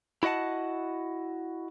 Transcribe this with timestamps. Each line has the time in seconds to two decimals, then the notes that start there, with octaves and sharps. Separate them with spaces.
0.23 E4 F#4 D#5 F#5 A5